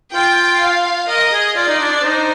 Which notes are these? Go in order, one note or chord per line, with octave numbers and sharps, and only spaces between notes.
F4 G5
F5
A#4 D#5
G#4
F4 D5
D#4
D4
D4
D#4 C5